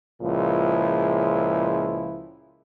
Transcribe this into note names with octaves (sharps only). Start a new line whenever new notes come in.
C#2 A#2 F3 E4 G#4